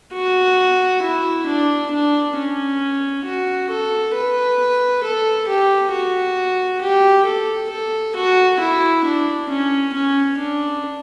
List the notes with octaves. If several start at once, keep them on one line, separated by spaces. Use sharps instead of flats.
F#4
E4
D4
D4
C#4
F#4
A4
B4
A4
G4
F#4
G4
A4
A4
F#4
E4
D4
C#4
C#4
D4